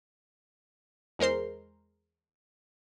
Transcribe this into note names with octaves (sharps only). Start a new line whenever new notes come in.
E2 G#3 A#4 C5 C6